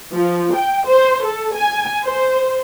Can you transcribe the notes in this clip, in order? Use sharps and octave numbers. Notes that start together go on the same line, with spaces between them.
F3
G5
C5
A4
G#5
C5